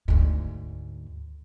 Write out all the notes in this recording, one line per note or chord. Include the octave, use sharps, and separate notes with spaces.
D2 G#2